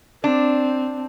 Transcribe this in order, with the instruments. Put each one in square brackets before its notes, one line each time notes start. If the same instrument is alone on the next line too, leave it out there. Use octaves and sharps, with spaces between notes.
[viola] C4 [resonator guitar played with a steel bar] D4